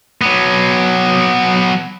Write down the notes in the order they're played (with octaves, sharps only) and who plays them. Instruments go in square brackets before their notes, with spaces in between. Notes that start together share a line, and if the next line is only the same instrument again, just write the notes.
[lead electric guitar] F#3 B3